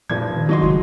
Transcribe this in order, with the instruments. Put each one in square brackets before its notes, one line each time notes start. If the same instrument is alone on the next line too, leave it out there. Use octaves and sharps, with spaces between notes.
[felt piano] F1 F3 G#6 [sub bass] A#2
[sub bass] D#3
[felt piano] F#3 D#5 C6
[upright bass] C#3 G#3